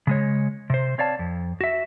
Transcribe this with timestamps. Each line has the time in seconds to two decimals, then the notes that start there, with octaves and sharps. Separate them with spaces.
0.07 C#3 G#3 C#5
0.70 C3 C5
0.98 C4 C#5 D5 F5 A5
1.19 F2
1.61 F#4 E5